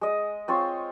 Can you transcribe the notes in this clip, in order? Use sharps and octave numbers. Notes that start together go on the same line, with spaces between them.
G#3 D#5
C4 F4 C5 C#5